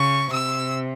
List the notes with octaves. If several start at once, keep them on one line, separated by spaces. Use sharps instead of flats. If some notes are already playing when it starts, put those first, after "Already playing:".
Already playing: C#3 C#6
C3 E6